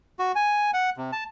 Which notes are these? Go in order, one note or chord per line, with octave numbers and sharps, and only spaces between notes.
F#4
G#5
F#5
C3
A5